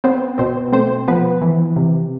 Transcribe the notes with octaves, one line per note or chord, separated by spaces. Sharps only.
B3 C4 C5
B2 C4 C5
A3 C4 C5
F3 B3 B4
E3
C3